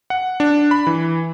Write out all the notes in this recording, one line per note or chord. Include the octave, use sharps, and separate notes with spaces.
F#5
D4
B5
E3